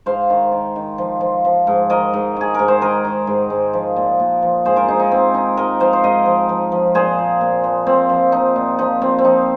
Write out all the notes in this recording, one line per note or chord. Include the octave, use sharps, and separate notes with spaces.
G#2 C5 F5
D#3
D#3
D#3
F3
F3
F3
G#2
D#3 A#4 D#5
G#2
D#3 G#4
G#2 A#4
C5
D#3 A#4 D#5
D#3
G#2
G#2
F3
A#2
A#2
F3
G#2 G#4 C5
F4 A#4
G#2 D#4 G#4
D#4
G#2 C4
D#3 D#4
G#2 A#4 D#5
F3 C5 F5
C5
G#2 A#4 D#5
F3
F3
F3
A#2 G#4 C5
A#2
A#2
F3
A#2 C4
F3
F3 D#4
A#2
F3 D#4
A#2 C4
C4
F3 D#4